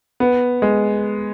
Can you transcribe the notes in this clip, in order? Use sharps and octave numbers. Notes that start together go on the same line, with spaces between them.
B3
G#3